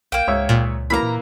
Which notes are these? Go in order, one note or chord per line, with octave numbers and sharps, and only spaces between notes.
B1 A#3 G5
C#2 G#2 C#5 E5
A#2
E3 A#3 A#5 B5
A#2